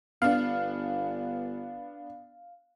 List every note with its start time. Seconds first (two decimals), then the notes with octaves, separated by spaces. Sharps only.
0.22 G1 B3 D4 F5